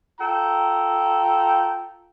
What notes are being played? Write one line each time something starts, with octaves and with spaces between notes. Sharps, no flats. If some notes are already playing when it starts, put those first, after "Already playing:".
F4 A4 G5 A#5